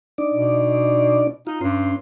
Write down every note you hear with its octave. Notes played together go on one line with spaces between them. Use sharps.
D4 D#4 D5
B2
D#4 F4
G2 C#4 C6